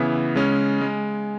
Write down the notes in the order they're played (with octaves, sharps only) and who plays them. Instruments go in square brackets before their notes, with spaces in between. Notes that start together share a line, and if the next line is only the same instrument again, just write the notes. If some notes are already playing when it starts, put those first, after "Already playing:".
Already playing: [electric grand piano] C#3 E3 B3 E4
C#3 G#3 C#4
G#3